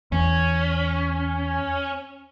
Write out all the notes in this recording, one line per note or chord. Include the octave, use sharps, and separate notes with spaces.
E2 C#4